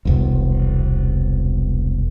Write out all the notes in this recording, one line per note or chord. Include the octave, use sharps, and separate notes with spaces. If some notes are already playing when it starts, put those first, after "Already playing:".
E1 C2